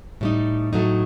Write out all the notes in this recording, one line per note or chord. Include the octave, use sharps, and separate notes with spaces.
A2 G3 D#4
A2 F#3 A3 D#4